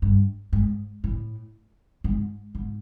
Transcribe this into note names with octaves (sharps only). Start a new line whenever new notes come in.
G2
G#2
A2
G#2
G#2